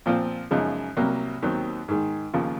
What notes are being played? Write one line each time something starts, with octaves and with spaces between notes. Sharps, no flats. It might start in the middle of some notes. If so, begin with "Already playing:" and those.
A#2 F3 C4 F4
F#2 C#3 F3 G#3 D#4
C2 C3 F#3 A#3
D#2 D#3 F#3 C4
G#2 D#3 G#3
D#2 C#3 F3 A#3 F4